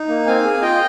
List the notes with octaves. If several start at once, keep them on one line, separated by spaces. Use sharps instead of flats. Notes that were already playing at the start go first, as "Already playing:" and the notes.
Already playing: D#4
A#3
C4 F5 G#5
G#4
F4 D#5 G5